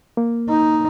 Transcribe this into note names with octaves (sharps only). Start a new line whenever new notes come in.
A#3
D#4